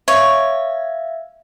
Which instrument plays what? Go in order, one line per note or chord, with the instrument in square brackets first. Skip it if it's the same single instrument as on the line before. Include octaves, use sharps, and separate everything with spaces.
[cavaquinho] C#5 [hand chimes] E5 F5